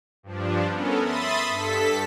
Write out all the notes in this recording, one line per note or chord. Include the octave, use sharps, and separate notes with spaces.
G2 F3 D4
B3 C#4 A4 A#4
E5 B5 C6 D#6 A6
G2 A4 B6